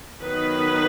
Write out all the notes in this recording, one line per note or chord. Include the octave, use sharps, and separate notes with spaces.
D#3 F#3 B3 D#4 B4